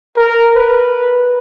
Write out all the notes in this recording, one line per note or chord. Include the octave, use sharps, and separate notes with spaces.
A#4
B4